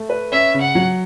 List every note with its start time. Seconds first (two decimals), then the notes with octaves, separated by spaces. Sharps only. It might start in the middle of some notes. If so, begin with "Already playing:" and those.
Already playing: A3
0.10 B4
0.32 C#4 E5
0.54 C#3
0.62 F#5
0.75 F#3